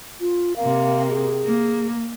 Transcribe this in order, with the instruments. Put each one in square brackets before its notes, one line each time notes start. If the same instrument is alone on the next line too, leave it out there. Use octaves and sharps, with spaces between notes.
[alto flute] F4
[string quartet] C3 A#3 [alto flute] F5
[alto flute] G#4
[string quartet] A#3